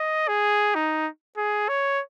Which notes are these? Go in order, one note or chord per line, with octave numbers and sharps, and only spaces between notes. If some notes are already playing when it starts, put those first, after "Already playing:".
Already playing: D#5
G#4
D#4
G#4
C#5